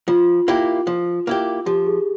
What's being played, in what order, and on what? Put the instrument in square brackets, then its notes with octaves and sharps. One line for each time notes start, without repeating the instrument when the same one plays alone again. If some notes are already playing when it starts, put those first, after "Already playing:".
[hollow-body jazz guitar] F3 [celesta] F4
[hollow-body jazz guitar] A#3 E4 G4
F3
A#3 E4 G4
[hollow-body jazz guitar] F3 [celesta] G4
[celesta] G#4